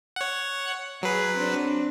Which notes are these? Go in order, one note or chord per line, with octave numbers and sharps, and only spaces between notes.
C#5 F#5
F#3 G#4 B4
C4 D4